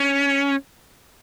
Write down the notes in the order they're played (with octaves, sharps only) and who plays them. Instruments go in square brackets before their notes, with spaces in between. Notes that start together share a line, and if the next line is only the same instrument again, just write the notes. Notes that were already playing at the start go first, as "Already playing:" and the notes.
Already playing: [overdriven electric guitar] C#4